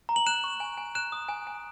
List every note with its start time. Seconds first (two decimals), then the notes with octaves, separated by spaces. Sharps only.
0.09 A#5
0.16 F#7
0.27 F#6 E7
0.44 C#6
0.60 G#5
0.78 G#5
0.95 F#6 E7
1.12 D#6
1.29 G#5
1.47 G#5